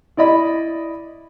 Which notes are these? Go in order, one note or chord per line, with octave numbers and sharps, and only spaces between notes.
E4 D5 D#5 B5